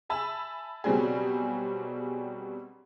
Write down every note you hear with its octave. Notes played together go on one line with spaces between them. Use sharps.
E5 G#5 A5 B5 E6
B2 F#3 G3 C4 D4 G#4